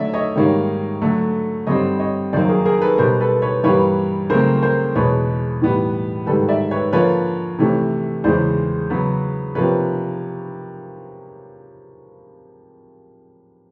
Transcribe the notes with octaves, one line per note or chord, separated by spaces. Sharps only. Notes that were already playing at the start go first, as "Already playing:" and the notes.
Already playing: D3 F#3 A3 C#4 D5 E5
C#5 D#5
G#2 D#3 G3 A#3 C#4
D3 F#3 A3
G2 D3 G3 C4 C#5 D#5
C#5 D#5
F#2 D#3 F#3 A#3 C5 D5
G#4 A#4
G#4 A#4
A4 B4
B2 G3 B3 A#4 C5
A4 B4
B4 C#5
G2 E3 G3 A#3 C#4 B4 C#5
C#3 F#3 A3 C4 A#4 C5
A#4 C5
E2 B2 G#3 C#4 B4 C#5
A2 E3 G3 B3
G#2 D#3 G3 A4 B4
D5 E5
B4 C#5
D3 F3 A#3 C#4 B4 C#5
C3 E3 A3 C#4
E2 C#3 E3 G#3 C#4 C5 D5
C#3 F#3 B3
C3 F3 A#3 C#4 B4 C#5